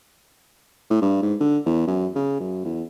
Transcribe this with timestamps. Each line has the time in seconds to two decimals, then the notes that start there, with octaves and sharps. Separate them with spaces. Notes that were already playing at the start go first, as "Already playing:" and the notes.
0.90 A2
1.02 G2
1.22 G#2
1.40 D3
1.66 E2
1.87 F#2
2.15 C#3
2.40 F#2
2.65 E2